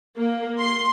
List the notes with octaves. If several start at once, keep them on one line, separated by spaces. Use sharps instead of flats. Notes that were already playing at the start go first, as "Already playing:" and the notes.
A#3
C6